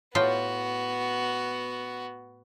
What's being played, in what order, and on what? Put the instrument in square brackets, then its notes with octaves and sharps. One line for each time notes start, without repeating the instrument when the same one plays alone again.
[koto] A2 F4 G5 [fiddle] B3 F#4